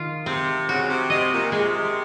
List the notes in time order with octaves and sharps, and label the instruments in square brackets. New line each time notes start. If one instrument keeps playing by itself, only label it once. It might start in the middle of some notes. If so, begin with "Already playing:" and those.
Already playing: [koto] D#3 F4
[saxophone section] C3 [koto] C4
[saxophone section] C#3 [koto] F#4
[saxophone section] C3
[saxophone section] C3 [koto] D#5
[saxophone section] A#2
[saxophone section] C3 [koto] G#3